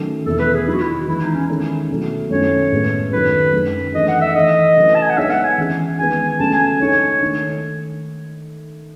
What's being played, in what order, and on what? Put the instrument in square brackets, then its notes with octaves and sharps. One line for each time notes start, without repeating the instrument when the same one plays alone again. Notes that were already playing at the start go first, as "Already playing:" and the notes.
Already playing: [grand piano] D#3 F#3 A3 C#4
[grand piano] E2 B2 A3 E4 [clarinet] A4
[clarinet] B4
G#4
[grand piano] D#3 F#3 B3 D#4 [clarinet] E4
[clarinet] F#4
E4
[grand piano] E3 G#3 B3 [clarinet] E4
[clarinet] D#4
C#4
[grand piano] D#3 G#3 C#4 E4 A4
B2 F#3 A3 E4
[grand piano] F#2 D#3 A3 C#4 E4 [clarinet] C#5
[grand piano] A2 G#3 B3
[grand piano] F#2 D#3 F#3 A3 [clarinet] B4
[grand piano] F#2 D#3 G#3 C#4
[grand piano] E3 A3 D#4 G#4 [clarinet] D#5
[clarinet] F#5
E5
[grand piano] E3 A3 D#4 [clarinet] D#5
[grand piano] C#3 F#3 A3 E4 B4
[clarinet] A5
G#5
F#5
[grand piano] G#3 B3 D#4 A4 C#5 [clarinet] E5
[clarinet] F#5
G#5
[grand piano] E3 G#3 C#4 E4 G#4
[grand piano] D#3 G#3 B3 [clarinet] G#5
[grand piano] C#3 F#3 A3 C#4 [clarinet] A5
[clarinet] G#5
G#5
[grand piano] G#3 D#4 A4 [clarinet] C#5
[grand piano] D#3 A3 D#4